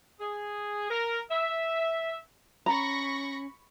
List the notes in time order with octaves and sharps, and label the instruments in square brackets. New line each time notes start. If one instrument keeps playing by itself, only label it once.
[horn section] G#4
A#4
E5
[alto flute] C#4 [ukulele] A#5 [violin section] B5 C#6 A#6